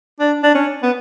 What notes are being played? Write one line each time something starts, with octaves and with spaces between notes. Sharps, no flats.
D4
D4
C#4
B3